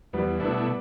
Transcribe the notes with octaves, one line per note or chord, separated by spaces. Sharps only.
E2 G3 B3
B2 A3 B3 D4 E4